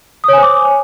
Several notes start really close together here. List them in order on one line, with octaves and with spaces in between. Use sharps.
D#6 C#5 G#5 C5 D6